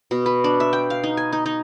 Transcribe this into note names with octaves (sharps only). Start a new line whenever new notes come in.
B2
B4
D4
E5
G5
F5
D#4
G#5
D#4
D#4